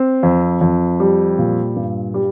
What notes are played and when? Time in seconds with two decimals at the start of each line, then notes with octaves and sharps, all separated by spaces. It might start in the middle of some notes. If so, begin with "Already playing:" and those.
Already playing: C4
0.23 F2
0.61 F2
1.00 G3
1.38 A#2
1.76 G2
2.14 G3